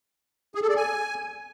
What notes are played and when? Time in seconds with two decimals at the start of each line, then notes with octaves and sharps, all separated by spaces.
0.55 G#4
0.62 A4
0.69 D5
0.76 G#5